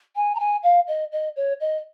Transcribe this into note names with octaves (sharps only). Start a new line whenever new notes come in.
G#5
A#5
G#5
F5
D#5
D#5
C#5
D#5